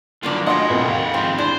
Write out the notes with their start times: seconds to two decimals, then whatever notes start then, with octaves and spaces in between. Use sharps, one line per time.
0.23 G2 B2 D#3 F#3 A#3 D4 F4
0.46 A2 F#3 D4 F4 D#5 F#5 G5
0.69 F2 B2 E4 A#4
0.89 D#2 G#4 F5
1.14 F2 G#2 C4
1.38 E2 D4 E4 C5 C6